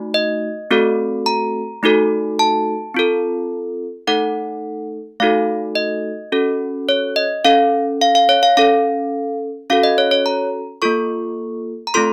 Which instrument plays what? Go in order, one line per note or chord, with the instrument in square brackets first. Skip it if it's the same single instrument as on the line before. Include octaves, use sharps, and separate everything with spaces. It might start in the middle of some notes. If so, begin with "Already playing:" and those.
Already playing: [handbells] A3 D#4 F#4
D#5
A3 C4 F#4 A4
A#5
A3 D#4 F#4 A4
A5
C4 F4 A4
A3 D#4 A4 F#5
A3 D#4 F#4 A4 F5
D#5
C#4 F#4 A4
C#5
D#5
C#4 A4 F5
F5
F5
C#5
F5
C#4 A4 F5
C#4 F#4 A4 F5
D#5
C#5
C#5
A#5
A#3 F4 A4 C#6
A#5
A3 C4 F4 A4 C6